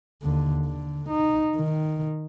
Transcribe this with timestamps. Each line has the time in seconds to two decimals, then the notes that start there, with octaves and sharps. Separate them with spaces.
0.22 D#2 D3
0.67 D3
1.09 D#4
1.57 D#3